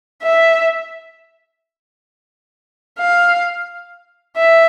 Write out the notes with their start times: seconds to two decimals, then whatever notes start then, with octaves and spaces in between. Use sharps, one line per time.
0.23 E5
2.99 F5
4.37 E5